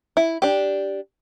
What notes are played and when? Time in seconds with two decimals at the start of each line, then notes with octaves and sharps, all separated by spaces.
0.17 E4
0.42 D4 G4